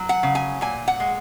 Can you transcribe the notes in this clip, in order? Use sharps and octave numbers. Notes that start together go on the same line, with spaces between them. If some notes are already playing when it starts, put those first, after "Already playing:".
Already playing: F#3
F#5
C#3
G#5
A#2 G#5
F#5
G#3